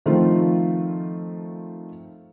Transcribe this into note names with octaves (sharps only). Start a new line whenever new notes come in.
D#3 F3 A3 C4 F4